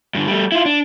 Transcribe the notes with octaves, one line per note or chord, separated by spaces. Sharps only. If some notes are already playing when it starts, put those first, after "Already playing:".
G2 D3
G3 A3
E4 F4
D4